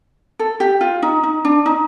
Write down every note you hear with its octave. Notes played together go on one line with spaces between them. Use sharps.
A4
G4
F4
D#4
D#4
D4
D#4